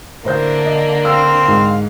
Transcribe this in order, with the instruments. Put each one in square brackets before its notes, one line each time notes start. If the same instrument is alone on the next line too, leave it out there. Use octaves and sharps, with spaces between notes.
[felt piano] A2 C5 G6 [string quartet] D3 A#3 D4
[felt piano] D#5
[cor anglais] C4 [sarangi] F5 [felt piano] E6
[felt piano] G#2